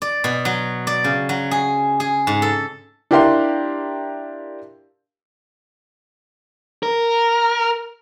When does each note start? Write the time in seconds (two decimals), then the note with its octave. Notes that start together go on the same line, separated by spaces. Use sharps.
0.02 D5
0.24 B2
0.45 F#3
0.87 D5
1.04 C#3
1.29 F#3
1.51 G#4
2.00 G#4
2.27 G#2
2.42 A4
3.11 D4 E4 G4 A#4 F5 C6
6.83 A#4